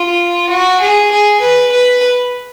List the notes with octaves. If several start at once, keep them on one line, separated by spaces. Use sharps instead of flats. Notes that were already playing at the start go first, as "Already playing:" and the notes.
Already playing: F4
F#4
G#4
G#4
B4
B4